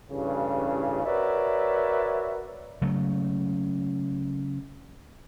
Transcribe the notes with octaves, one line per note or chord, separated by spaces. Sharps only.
A1 G2 C#3
F#4 A#4 B4 C#5 D5 E5
C#3 F#3 A3